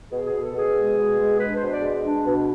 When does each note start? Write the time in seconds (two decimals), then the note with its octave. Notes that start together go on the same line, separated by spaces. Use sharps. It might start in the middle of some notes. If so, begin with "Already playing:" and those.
0.10 B2 G#4
0.26 G#4
0.32 B2
0.42 A4
0.53 B2
0.59 G#4
0.74 G#3
0.97 B2
1.17 G#3
1.39 D4 B4
1.56 C5
1.61 B2
1.72 D5
1.82 G#3
2.04 D4
2.26 B2